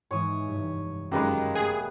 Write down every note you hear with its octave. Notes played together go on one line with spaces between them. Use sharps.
G#2 E3 G#3 C#5 D#6
F1 G2 B6
F#2 D#3 G#3 G4 A#4 B4 D#5 F5
A3 B3 G#4